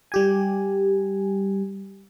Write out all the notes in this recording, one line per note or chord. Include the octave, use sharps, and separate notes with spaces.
G3 G4 G#5